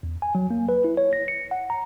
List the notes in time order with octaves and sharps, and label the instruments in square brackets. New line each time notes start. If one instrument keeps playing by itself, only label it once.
[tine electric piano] E2
G#5
F#3
A#3
B4
E4
C#5
A#6
C#7
F#5
A#5